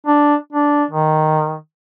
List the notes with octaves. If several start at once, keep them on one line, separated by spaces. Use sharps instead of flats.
D4
D4
D#3